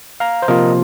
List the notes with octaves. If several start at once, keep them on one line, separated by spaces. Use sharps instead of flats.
F5 A#5
C5
C3 F3 A#3 F4 A#4 D#5